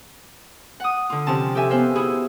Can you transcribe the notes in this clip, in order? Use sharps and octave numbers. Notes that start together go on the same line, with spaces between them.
F#5 D#6
D3 F4
C3 F3 C#4 A5
G4 A4 E5 G#5
B3 B4 C5 E5 F5
E4 F#4 G#4